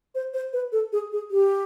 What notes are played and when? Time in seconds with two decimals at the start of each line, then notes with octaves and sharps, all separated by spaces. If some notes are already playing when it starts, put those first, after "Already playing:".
0.15 C5
0.33 C5
0.53 B4
0.72 A4
0.92 G#4
1.12 G#4
1.31 G4